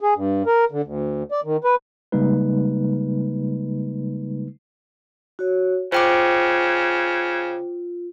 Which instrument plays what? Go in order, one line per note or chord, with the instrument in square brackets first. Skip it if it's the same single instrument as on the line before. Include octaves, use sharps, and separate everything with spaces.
[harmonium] G#4
G2
A#4
D3
D2
D5
D#3
B4
[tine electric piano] C#3 G3 G#3 A#3 D#4 B4
[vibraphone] F#4 C#5
[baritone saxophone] C#3 [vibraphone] F4 [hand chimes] C5 G5 D6